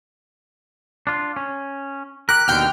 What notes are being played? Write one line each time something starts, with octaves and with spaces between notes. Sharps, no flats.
D4 F4
C#4
G4 A#4 F#6
D#2 B2 D3 G5 F6